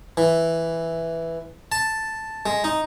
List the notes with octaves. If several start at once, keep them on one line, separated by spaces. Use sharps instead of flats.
E3
A5
G#3
D#4